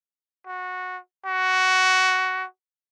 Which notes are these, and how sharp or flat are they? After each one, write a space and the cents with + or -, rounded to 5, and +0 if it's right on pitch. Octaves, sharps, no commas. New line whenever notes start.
F#4 -15
F#4 +10